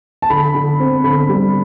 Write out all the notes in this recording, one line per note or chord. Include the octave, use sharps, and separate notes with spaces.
A5
D3 B5
D3
C4
D3 B5
G3